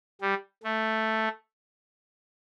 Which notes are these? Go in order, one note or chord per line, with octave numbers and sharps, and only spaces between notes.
G3
A3